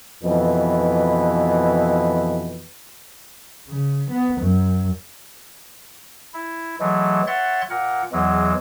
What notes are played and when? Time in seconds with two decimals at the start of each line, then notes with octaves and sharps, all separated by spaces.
0.23 F2 B2 E3 B4
3.68 C#3
4.11 B3
4.41 F#2
6.34 E4
6.80 E3 F#3 G#3 A3
7.27 C#5 E5 F#5 C6 F#6 A6
7.70 A#2 A#4 F#5
8.12 E2 E3 F#3 G#3